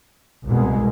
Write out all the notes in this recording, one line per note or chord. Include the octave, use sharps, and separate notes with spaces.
C2 B2 G#3